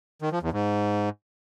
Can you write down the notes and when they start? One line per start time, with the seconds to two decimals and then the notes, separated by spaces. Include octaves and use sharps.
0.22 D#3
0.32 F3
0.42 E2
0.53 G#2